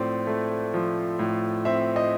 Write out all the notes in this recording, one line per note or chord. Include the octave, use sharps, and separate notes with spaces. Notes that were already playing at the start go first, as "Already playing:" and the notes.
Already playing: A2 F3 C4 D5
A3
F3
A2
C4 E5
D#5